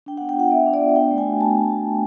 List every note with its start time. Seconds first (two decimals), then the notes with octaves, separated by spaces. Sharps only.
0.06 D4 G5
0.17 B3 F#5
0.29 G5
0.36 F4 F#5
0.51 B3 E5
0.66 D4
0.74 D5
0.81 B3
0.96 D4 G5
1.11 A3
1.18 G#5
1.26 F#4
1.41 A3 A5
1.56 D4